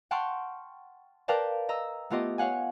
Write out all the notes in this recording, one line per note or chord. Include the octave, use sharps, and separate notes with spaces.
F#5 G5 A5 C6 C#6 F6
A#4 B4 D5 F5 G5 A5
D#5 A#5 E6
A3 B3 F4 G4 D#5
C#5 F5 F#5 G#5